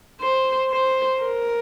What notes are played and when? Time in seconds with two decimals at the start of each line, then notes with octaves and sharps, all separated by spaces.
0.21 C5
0.71 C5
1.22 A#4